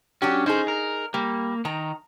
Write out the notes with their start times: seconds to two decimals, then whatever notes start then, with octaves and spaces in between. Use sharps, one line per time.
0.22 F#3 C#4 D4 G4
0.46 C#4 D#4 G#4 C5
0.68 A#4
1.14 G3 A#3
1.65 D#3 A#5